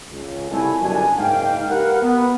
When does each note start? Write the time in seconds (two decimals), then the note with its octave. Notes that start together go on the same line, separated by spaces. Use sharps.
0.11 C#2
0.51 C2 A3 E4 G#5
0.82 G1 F#2 B2 G3 D4 G#5
1.17 F#1 G#2 A#3 F5 G5
1.69 G4 A#4 B4 F5 F#5
2.01 B3